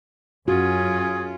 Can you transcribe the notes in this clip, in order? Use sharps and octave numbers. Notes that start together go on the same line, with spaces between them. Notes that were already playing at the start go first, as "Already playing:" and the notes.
F#2 C#4 F4 F#4 G#4